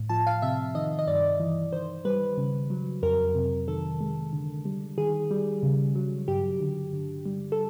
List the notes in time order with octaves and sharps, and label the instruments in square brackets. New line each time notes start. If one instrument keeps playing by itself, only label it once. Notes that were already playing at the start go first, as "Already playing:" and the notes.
Already playing: [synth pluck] A2
F3 A5
F5
C3 E5
D#3 D#5
D#5
G2 D5
E3
D#3 C5
G3 B4
C#3
F#3
F2 A#4
C3
D#3 A4
G#3
D3
G3
D#3 G#4
G3
C#3
F#3
G2 G4
D3
D3
G3
A4